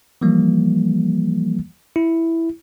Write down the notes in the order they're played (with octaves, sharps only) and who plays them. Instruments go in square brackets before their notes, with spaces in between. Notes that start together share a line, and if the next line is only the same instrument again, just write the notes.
[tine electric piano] E3 F3 G3 A#3
E4